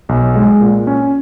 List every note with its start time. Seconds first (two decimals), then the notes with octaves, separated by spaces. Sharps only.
0.09 B1
0.36 G#3
0.61 A#2
0.87 C#4